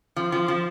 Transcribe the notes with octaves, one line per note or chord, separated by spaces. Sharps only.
F3
F3
F3